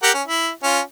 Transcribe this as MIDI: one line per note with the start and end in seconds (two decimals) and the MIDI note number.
0.03 0.11 67
0.03 0.11 70
0.03 0.11 78
0.14 0.22 61
0.27 0.49 64
0.63 0.80 61
0.63 0.80 65